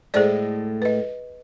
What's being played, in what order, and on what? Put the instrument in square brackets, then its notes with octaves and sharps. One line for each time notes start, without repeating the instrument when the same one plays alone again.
[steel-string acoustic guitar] A2 G#3 A3 [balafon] G#4 C5 D5
[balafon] B4 D#5